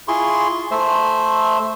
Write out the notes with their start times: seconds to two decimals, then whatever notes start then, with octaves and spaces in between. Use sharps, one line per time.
0.08 E4 F4 G#4 C6 C#6
0.71 A3 C5 E5